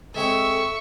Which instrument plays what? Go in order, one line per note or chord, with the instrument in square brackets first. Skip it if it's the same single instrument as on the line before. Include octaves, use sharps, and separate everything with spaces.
[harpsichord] G#3 C4 C#5 [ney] A4 [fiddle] E5 C#6